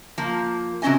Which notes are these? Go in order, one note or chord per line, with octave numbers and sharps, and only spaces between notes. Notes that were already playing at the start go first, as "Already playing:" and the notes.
F3 A#3
C3 F#3 G3 C#4 D#5 G#5